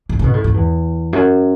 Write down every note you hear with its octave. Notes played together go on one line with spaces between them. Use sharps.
G#2
C#3
B2
A2
G#2
E2
F#2